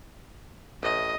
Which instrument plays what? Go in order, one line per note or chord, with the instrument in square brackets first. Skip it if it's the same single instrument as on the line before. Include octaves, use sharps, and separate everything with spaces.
[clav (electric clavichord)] A1 A2 [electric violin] D#5